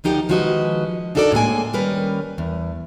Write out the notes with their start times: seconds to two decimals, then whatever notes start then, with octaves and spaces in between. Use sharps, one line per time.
0.04 D2 F3 D#4 G4 A#4 F#5
0.29 D#3 F3 G#3 F#4 B4 D#5
1.15 D4 D#4 F#4 A4 A#4 D5
1.32 A2 G#3 A#3 G#5
1.73 D#3 G3 C#4 A#4 B4
2.38 E2